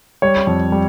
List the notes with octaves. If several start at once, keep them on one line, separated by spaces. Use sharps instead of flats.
G3 C#5
F2
G3